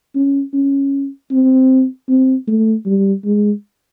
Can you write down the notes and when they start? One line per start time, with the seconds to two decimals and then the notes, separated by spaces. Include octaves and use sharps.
0.15 C#4
0.54 C#4
1.31 C4
2.08 C4
2.47 A3
2.86 G3
3.25 G#3